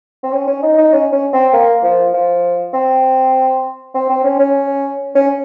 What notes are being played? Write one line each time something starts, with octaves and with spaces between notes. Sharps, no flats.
C4
C#4
C#4
D#4
D#4
C#4
C#4
C4
A#3
F3
F3
C4
C4
C4
C#4
C#4
C#4